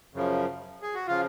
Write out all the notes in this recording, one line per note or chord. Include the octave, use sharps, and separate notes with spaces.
F#2 C#3 F3
G#4
F#4
C#3 F3 F4